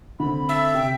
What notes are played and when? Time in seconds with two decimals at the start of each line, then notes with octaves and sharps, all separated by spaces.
0.20 D3 C4 B5
0.49 A4 E5
0.74 C3 G5